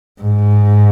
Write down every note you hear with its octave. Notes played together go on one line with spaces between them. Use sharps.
G#2